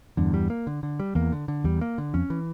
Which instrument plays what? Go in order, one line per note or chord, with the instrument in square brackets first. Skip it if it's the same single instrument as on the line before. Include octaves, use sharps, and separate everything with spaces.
[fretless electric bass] E2 G2 [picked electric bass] D3
[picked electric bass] G3
A#3
D3
D3
G3
[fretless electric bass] E2 [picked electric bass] A#3
[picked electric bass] D3
D3
[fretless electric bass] E2 [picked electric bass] G3
[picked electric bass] A#3
D3
[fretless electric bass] F2 [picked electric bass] C#4
[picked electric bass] E3